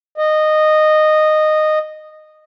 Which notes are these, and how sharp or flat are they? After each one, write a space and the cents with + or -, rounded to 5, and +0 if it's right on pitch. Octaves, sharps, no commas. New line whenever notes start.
D#5 -15